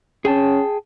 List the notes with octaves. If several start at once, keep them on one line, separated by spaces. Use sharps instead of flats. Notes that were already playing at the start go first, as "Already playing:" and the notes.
C#4 G#4 G5 A5